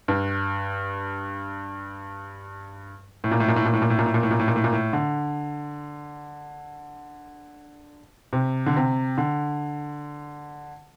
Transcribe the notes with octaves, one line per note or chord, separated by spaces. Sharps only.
G2
A2
A#2
A2
A#2
A2
A#2
A2
A#2
A2
A#2
A2
A#2
A2
A#2
A2
A#2
A2
A#2
A2
D3
C3
D3
C3
D3